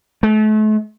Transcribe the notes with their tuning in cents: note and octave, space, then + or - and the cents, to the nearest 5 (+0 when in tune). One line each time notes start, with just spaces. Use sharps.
A3 -40